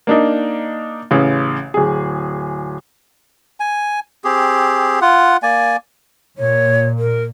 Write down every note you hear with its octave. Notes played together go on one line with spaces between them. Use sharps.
A#3 D4 D#4
A1 C#3
D1 G#4
G#5
C4 G4 G#4
F4 F#5
A#3 D5 G#5
A#2 C#5
A#4